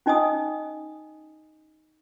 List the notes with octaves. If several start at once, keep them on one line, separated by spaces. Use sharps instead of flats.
C#4 D#4 D#5 G#5 D#6